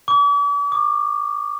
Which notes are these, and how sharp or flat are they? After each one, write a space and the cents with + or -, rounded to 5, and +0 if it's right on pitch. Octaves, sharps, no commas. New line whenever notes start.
D6 -45
D6 +35